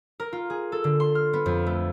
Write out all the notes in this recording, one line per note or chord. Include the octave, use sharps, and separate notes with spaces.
A#4
F4
G#4
A4
D3
C6
F6
B3
F2
A3